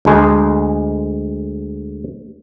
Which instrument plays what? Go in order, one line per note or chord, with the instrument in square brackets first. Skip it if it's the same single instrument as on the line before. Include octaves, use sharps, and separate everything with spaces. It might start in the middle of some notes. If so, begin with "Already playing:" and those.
[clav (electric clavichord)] D2 G#3